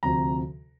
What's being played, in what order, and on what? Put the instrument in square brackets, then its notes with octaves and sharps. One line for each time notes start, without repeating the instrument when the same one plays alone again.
[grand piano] D2 C3 F3 A#5